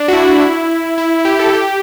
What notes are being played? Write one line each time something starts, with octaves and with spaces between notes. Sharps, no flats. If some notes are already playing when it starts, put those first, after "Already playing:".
Already playing: D4
F#4
E4
E4
E4
G4
A4
G4